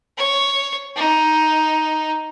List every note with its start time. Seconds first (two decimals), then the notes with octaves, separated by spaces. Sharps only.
0.18 C#5
0.96 D#4